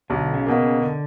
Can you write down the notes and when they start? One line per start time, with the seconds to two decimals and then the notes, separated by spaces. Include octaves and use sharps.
0.10 B1 D3
0.34 C#3
0.46 B2 A#3
0.58 C#3
0.82 D3